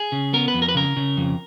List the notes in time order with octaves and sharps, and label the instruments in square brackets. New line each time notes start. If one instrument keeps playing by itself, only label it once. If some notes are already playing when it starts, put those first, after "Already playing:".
Already playing: [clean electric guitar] G#4
C#3
B3 A#4
B4
F2
A#4
B4
C#3 A#4
C#3
F2